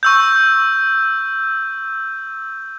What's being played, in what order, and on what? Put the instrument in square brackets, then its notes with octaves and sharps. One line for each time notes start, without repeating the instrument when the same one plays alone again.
[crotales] C#6 E6 G6